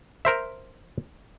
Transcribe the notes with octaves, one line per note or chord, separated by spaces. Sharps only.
A#4 C5 E5